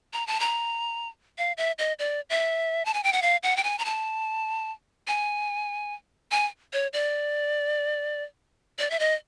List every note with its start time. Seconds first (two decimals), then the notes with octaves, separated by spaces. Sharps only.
0.13 A#5
0.27 A5
0.40 A#5
1.38 F5
1.57 E5
1.78 D#5
1.99 D5
2.30 E5
2.85 A5
2.94 G#5
3.04 G5
3.13 F#5
3.22 F5
3.43 F#5
3.57 G5
3.64 G#5
3.79 A#5
3.85 A5
5.07 G#5
6.31 G#5
6.73 C#5
6.93 D5
8.79 D5
8.90 E5
8.99 D#5